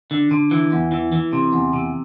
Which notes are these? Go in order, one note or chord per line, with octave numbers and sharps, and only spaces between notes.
D3
D3
E3
E2
E3
E3
C3
E2
C3